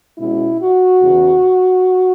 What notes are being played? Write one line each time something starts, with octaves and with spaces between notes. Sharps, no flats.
B2 G#3 C#4 E4
F#4
E2 C#3 E3